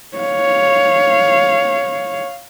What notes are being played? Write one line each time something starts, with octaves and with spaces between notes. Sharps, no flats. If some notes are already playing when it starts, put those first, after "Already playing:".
C#5 F5